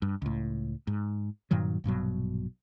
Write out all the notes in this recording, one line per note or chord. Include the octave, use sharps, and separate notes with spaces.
G2
C#2 A2
G#2
G2 A#2 D#3 F#3
A#1 G2 B2 F#3